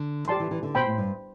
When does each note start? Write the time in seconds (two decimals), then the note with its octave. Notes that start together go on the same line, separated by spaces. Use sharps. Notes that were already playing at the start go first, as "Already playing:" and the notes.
Already playing: D3
0.28 F3 G4 D5 A5 C6
0.40 E3
0.51 E3
0.63 D3
0.75 B2 C5 G5 B5
0.86 A2
0.98 G2